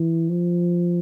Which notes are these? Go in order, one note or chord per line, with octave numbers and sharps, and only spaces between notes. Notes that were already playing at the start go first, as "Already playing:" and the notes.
Already playing: E3
F3